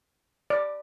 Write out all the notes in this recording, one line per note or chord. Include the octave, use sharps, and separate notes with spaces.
D5